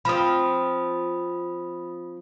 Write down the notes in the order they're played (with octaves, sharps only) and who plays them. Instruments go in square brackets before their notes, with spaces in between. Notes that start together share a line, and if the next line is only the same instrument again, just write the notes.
[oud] F3 C4 [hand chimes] B5 D#6